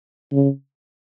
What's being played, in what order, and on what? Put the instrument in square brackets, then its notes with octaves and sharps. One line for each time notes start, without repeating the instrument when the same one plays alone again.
[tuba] C#3